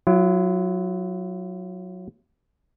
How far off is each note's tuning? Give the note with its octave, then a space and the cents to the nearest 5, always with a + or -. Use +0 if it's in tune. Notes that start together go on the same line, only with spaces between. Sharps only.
F#3 -10 E4 +45